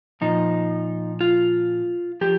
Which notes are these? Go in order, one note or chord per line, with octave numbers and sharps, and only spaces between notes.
A#2 F3 D#4
F4
F3 G4